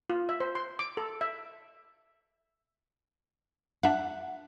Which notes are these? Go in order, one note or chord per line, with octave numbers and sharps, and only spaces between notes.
F4
E5
C5
C6
D6
A4
E5
D4 E5 F#5